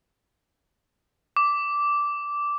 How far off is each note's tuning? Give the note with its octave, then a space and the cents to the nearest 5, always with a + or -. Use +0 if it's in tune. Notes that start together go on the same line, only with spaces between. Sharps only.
D6 -10